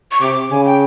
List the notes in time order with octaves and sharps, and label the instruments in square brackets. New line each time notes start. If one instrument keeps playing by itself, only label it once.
[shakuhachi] C#6
[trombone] C3 [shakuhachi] D6
[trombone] C#3 [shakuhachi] G#5
[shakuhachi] G5